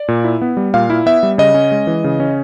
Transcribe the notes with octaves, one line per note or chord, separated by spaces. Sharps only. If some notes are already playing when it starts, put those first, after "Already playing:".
Already playing: D5
A#2
E4
B3
G3
A#2 F5
E4
B3 E5
G3
C#3 D#5
C#4
G#3
E3
C#3
C#4